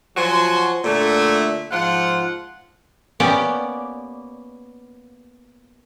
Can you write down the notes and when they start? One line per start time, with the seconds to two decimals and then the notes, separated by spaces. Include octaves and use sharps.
0.17 F3 F#3 F#4 G#5 C6
0.84 A#2 D3 A3
1.71 G#2 F3 F4 F#5
3.20 A#3 B3 C#4 G4 D5